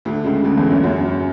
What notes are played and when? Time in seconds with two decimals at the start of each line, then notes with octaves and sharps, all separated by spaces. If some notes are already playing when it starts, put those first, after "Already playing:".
0.05 D2 D3
0.24 C#2 C#3
0.44 D2 D3
0.57 E2 E3
0.70 F#2 F#3
0.83 F#2 F#3